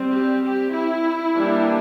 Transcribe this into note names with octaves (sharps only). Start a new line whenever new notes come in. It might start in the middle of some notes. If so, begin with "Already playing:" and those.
Already playing: G3 C4
G4
G4
E4
E3 G3 A#3 D4